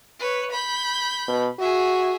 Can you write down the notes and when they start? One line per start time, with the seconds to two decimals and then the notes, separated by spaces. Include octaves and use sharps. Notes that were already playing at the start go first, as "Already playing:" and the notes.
0.20 B4 C#5
0.51 B5 G6
1.28 B2
1.60 F#4 G#4 E5